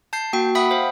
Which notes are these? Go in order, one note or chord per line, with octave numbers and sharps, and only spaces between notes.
A5 G6 C7
A#3 F#4 G5
E5 F#5 G5 B5 D#6 B6
C5 F5